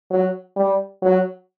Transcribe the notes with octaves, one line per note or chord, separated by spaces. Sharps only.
F#3
G3
F#3